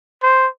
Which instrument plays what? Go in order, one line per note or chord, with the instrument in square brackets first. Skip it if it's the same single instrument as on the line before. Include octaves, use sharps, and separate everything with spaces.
[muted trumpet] C5